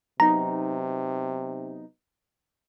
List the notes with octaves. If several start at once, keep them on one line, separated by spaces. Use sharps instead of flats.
C3 F#3 B3 D#4 A#5